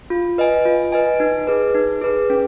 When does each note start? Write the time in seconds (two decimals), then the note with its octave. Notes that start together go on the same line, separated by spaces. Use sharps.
0.10 F4
0.38 B4 D#5 G#5
0.66 F4
0.92 B4 D#5 G#5
1.20 D#4
1.47 G#4 B4
1.74 D#4
2.01 G#4 B4
2.30 C#4